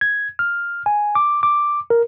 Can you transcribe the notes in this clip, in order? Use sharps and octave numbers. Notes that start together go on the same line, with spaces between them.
G#6
F6
G#5
D6
D6
A#4